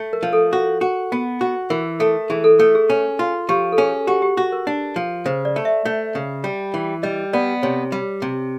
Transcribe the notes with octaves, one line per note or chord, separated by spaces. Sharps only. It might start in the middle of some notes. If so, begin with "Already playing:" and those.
Already playing: A3
A#4
F3
A4
F#4
F#4
B3
F#4
E3 A#4
A3 A4
E3 G#4
A4
A3 A4
G#4
C#4
F4
F3 G4
A4
C#4 G#4
F#4 G4
G4
F#4
A#4
D4
F3
C#3 C5
D5
A3
E5
A3
C#3
G3
E3
G3 D#5
B3 D5
C3 C#5
G3
C3